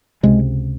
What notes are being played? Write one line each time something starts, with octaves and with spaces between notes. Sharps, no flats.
C#2 C3 G#3